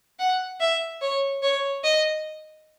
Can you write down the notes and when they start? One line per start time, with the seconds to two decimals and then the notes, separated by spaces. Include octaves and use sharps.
0.19 F#5
0.60 E5
1.01 C#5
1.43 C#5
1.84 D#5